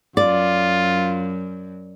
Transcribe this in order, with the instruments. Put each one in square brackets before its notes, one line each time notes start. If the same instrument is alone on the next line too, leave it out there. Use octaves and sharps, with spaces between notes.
[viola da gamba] F#2 [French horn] F4 [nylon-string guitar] D5